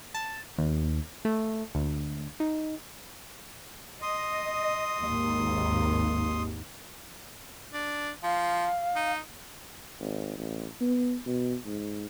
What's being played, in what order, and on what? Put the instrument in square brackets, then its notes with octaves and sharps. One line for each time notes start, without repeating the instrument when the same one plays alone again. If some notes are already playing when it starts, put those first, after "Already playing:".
[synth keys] A5
D#2
A3
D2
D#4
[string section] D#5 [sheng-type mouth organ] C6 D#6
[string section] G#1 D#2
[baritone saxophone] D4
[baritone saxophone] F3 [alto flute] F5
[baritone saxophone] D#4
[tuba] G#1
A1
B3
B2
G#2